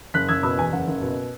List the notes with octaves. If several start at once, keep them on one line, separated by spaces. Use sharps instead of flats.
F#1 F#6 B6
F#1 E6 G#6
B2 B5 E6
E2 G#5
F#1 F#5
F#1
B2